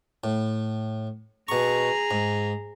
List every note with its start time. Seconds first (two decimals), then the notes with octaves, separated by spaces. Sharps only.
0.24 A2
1.48 B2 G#4 A#5 C#6
2.11 G#2